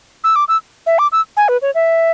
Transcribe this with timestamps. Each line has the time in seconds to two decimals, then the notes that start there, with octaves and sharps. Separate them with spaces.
0.24 E6
0.36 D6
0.48 E6
0.86 E5
0.99 D6
1.12 E6
1.37 G#5
1.48 B4
1.62 C#5
1.75 E5